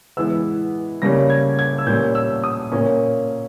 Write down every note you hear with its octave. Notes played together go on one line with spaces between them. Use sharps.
E3 G#3 B3 E6
C#3 G3 A#3 C#4 A#6
G#6
G#6
E6
A#2 G3 C#4 G6
E6
D#6
A#2 A#3 C#4